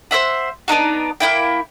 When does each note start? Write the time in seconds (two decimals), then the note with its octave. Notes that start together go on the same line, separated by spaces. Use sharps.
0.11 C5 C#5 E5 F#5
0.68 B3 D4 D#4 F#4
1.20 A#3 D#4 E4 G5